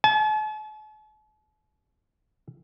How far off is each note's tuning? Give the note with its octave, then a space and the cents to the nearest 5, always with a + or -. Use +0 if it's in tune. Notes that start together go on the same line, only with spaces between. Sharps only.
A5 -45